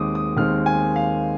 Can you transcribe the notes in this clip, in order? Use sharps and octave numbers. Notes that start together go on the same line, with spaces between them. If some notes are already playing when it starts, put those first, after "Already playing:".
Already playing: D#2 D#3 G#3 C4 D6 D#6
D#6
D#2 D#3 G#3 C4 F6
G#5
F5